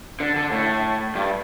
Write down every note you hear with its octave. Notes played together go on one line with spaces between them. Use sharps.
D3
D3
A2
G2